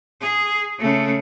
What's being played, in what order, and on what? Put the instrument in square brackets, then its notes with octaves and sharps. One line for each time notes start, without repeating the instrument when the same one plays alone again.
[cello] G#4
C#3 A3